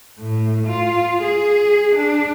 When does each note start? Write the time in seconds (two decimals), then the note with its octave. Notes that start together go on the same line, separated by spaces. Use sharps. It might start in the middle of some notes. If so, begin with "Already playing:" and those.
0.19 A2
0.65 F4
1.22 G#4
1.95 D4